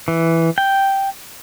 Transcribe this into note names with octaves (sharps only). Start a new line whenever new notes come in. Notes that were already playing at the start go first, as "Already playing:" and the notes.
E3
G5